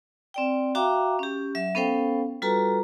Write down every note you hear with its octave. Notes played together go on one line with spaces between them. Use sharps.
C4 D5 G5
F#4 E5 F5 G5 A#5 D6
C#4 G4
F#3 E5
B3 C#4 A4 C5 F5 G5
G3 F4 F#4 A4 B4 A#5